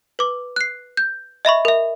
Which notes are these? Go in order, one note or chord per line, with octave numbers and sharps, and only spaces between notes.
B4 D6
F#6 C7
G6
D#5 E5 B5 C#6
A#4 E5